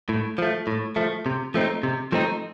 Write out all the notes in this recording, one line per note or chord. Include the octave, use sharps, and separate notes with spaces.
A2
F3 A3
A2
F3 A3
C3
F3 A3 C4 D#4
C3
F3 A3 C4 D#4